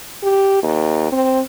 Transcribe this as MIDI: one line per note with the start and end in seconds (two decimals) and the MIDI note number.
0.23 0.62 67
0.63 1.08 39
1.12 1.40 60